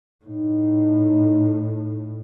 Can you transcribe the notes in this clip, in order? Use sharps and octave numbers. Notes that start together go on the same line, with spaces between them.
A2 D#4